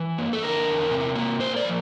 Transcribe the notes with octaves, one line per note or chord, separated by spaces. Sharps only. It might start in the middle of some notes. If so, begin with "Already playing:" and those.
Already playing: E3
A#3
A4
D3 A#4
E2
C3
A#3
A#3 C5
D5
F3